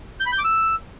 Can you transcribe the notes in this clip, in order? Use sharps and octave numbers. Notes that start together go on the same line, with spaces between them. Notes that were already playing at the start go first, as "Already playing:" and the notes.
G6
B5
G6
D6
E6